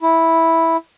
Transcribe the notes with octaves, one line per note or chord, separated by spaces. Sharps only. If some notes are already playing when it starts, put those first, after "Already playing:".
E4